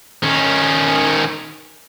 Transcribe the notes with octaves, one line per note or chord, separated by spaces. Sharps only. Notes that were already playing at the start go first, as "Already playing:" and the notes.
D#3 C#4